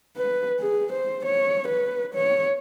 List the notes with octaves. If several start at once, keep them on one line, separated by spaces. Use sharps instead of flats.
B4
G#4
C5
C#5
B4
C#5